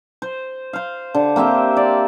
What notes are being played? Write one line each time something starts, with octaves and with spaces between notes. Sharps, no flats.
C5
C5 F5
D3
A#3 C4 G4 E5
D5